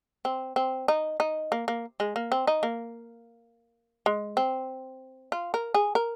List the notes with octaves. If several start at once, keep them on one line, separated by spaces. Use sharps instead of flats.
C4
C4
D#4
D#4
A#3
A#3
G#3
A#3
C4
D#4
A#3
G#3
C4
F4
A#4
G#4
A#4